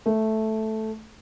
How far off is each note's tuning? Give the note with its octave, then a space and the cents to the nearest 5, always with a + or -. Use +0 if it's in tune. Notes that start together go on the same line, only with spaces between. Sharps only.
A3 -5